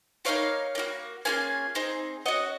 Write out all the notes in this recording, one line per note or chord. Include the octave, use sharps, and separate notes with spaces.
A#3 D#4 F#4 C#5 F5
A#3 D#4 F#4
A#3 C#4 F4 G#4 F5 G#5
C4 D#4 G#4
C#4 F#4 D#5 F#5